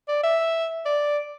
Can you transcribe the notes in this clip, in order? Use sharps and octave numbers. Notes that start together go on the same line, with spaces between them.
D5
E5
D5